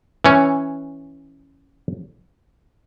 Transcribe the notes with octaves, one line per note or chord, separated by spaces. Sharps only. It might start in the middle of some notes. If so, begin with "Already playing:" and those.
E3 C#4